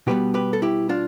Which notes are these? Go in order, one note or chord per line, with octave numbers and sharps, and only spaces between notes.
B2 G3 B3 G4 B4
G4 B4
A4
E4 G4
D4 F4